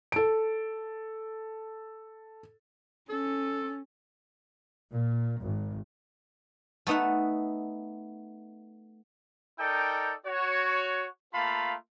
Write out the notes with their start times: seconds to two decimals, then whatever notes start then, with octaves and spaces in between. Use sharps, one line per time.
0.12 A4 D7
3.10 C#4 A4
4.91 A#2
5.40 G#1
6.87 A3 B3 D#4 E5 F#5
9.59 D#4 A4 A#4 D5 G5
10.26 F#4 C#5
11.34 A3 A#3 F4 F5 A5 B5